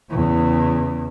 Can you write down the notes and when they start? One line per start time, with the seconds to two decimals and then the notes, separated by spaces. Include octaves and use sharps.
0.10 E2 C#3